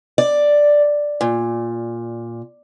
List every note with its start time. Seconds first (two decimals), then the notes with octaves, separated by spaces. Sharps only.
0.18 D5
1.21 A#2